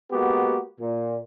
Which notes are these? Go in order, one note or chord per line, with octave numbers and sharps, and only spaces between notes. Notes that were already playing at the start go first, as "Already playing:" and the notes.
G#3 A#3 B3 F#4 G4
A#2